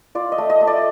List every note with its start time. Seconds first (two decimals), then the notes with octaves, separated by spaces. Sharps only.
0.15 F4 D5
0.32 D#5
0.38 A3
0.50 D#5
0.61 A3
0.67 D5